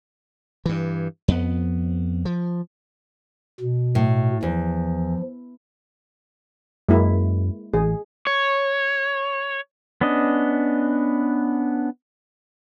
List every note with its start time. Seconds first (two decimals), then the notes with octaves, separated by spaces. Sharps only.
0.66 G2 E3
1.28 F2 B3
2.25 F3
3.60 B2
3.95 A2
4.43 E2 F3
6.88 F#2 G#3 A#3 E4
7.74 A1 G#4
8.27 C#5
10.01 B3 C#4 D4 D#5